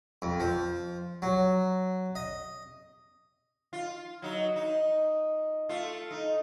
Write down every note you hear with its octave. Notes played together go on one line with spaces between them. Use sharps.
F2
F3
F#3
D#5
F4
F#3 D#4
D#4
A3 F4
D#4